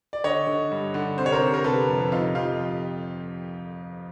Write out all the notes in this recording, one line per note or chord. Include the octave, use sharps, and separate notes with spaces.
D5
D3 C#5 D#5
D3
G2
D3
C3 C5
C#5
A#4 C5
C3
A#4
C3 A4 B4
F2
C3 D#4 F4
F2 F4 G4